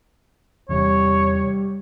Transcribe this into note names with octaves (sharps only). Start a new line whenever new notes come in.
E2 C3 E3 G3 C#5